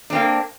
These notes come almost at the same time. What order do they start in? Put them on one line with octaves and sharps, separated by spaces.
D4 C4 A#3